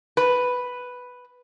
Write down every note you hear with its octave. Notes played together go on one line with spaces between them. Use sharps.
B4